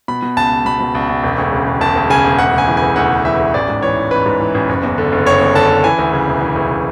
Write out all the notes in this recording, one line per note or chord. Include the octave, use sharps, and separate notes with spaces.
B2 B5
B2
C#2 A5
C#2
B2 B5
B2
C#2
C#2
E1
D2
C#3
E1
E1 A5
D2
C#3 G#5
E1
D2 F#5
C#3 G#5
E3
G#5
D2
D2 F#5
C#3
E3 E5
D2
A1 D5
G#2
E3 C#5
A1
A1 B4
G#2
E3
A1
F#1
E2
D3
F#1
F#1 C#5
E2
D3 A5
F#1
E3 G#5
D2
C#3
E1
E3
D2
C#3